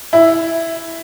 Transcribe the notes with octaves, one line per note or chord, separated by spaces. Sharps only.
E4